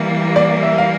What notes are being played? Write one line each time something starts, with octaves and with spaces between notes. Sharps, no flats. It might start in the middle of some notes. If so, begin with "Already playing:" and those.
Already playing: E3 G3 A#3
D5
E5
F5